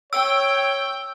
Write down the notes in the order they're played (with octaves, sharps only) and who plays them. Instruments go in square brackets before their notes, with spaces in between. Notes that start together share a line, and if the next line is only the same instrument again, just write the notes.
[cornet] C#5 [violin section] G5 [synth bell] E6